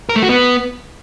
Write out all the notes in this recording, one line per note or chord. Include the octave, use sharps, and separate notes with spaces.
A#4
A3
F#4
B3